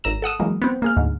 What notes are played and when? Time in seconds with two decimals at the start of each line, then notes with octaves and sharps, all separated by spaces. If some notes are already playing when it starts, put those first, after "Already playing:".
0.04 G#1 A#5 E6 E7
0.22 A4 F#5 D#6 E6
0.40 E3 F#3 G#3 A#3
0.62 B3 C4
0.82 A#3 G#4 F6
0.97 D2 G#2